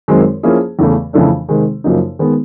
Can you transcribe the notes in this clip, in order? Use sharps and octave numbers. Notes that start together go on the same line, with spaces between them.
F#2 D#3 G#3 C4
F3 A#3 C#4 E4 G#4
E2 C#3 E3 A3
F2 C#3 E3 A3 D4
C3 D#3 G#3 C4
F#2 C#3 F3 A#3 D#4
D#3 G#3 B3